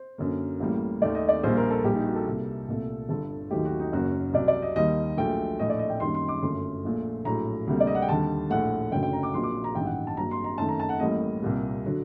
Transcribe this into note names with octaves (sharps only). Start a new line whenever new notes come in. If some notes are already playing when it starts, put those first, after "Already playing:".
Already playing: C5
F#2 D3 F#3 A#3
A1 A2 G3 A#3
D#2 D#3 A3 D5
D#5
D5
A#1 A#2 G3 A#3 C5
A#4
A4
A#1 A#2 G3 A#3 G4
D#4
F#4
A4
C2 C3 G3 A#3
C2 A#2 A3
G1 G2 D3 A4
D#2 D#3 F#3 A3 G4
F#4
D#4
F#1 F#2 F#3 A#3 F#4
C2 C3 F#3 D5
D5
D#5
D#2 D#3 G3 A#3 D#5
A#1 A#2 F#3 A3 G5
A#1 A2 A3 D#5
D5
D#5
G5
F#2 D#3 G3 A#3 C6
C6
D6
G1 F#2 F#3 A3 C6
A#1 A#2 A3
A#1 A2 F#3 A#5
D2 C3 G3 A#3
D5
D#5
F#5
G5
D#2 D3 G3 A5
A#1 A2 A3 F#5
F#1 F#2 D3 F#3 A3 G5
G5
A#5
D6
A#1 A#2 F#3 A#3 C6
D6
A#5
A1 G2 D#3 F#3 G5
F#5
A5
G2 F#3 A#3 A#5
C6
A#5
F#2 D#3 A3 A5
A#5
A5
F#5
A1 A2 G3 A#3 D#5
C2 A#2 G3 A#3
D3 F#3